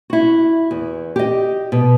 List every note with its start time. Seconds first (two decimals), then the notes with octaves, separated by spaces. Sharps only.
0.10 E4 F#4
0.71 E2
1.16 G4 D#5
1.72 B2